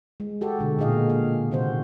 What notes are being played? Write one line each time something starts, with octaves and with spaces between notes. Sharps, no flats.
G#3
F#4 G4 A4
B2 D3 G#3
A#2 A#3 D#4 G#4 D#5 F5
F5
C3 D#3 C4 F#4 C5